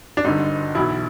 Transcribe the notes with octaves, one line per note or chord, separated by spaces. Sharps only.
D4
G#1 G2 D3 D#4
B1 B2 E3 E4